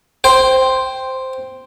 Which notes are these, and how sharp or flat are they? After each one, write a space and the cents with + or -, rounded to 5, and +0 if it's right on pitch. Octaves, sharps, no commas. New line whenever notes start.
C5 +0 G5 +0